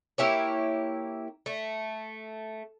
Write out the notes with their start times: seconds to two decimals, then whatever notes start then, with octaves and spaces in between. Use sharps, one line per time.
0.18 A#3 E4 G4 C#5
1.46 A3